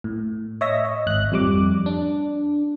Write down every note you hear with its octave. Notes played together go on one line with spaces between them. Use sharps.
A2
C#5 D#5 E5 A#6
D#5
G#1 F#6
F2 G3 D6
D4